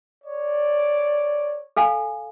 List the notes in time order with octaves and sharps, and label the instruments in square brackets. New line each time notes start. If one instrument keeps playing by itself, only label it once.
[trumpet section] C#5 D5
[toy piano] A4 F5 G#5